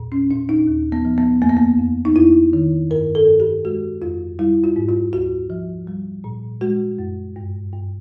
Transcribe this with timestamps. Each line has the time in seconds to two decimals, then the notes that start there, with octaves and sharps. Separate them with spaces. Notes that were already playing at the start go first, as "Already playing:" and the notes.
Already playing: E2 A#2
0.12 C#4
0.31 A#2 D4
0.49 D#4
0.67 D#2
0.92 B3
1.05 F3
1.18 B3
1.42 F2 A#3
1.50 B3
1.57 A#3
1.79 F2
2.05 D#4
2.16 F2 E4
2.53 D#3
2.90 G2 A#4
3.15 A4
3.27 G2
3.40 G4
3.65 G#3 F#4
4.02 F2 F4
4.39 G3 E4
4.64 F4
4.76 G#2
4.89 F4
5.13 D2 F#4
5.50 F3
5.87 G3
6.24 A#2
6.61 G#3 F#4
6.99 F#2
7.36 G2
7.73 G2